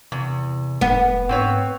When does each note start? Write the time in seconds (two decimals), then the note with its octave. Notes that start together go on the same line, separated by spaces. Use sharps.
0.12 E2 C3
0.81 F1 B3
1.29 G#2 C4 B4 C#5